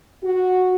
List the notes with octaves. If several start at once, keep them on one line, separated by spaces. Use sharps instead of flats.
F#4